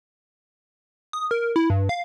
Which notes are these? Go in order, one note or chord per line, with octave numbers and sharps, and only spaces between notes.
D#6
A#4
E4
G2
F5